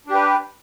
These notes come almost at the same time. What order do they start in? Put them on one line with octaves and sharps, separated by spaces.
D4 G4 B4